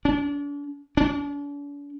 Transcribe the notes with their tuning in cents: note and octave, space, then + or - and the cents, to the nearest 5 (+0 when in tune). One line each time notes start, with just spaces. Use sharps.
D4 -40
D4 -45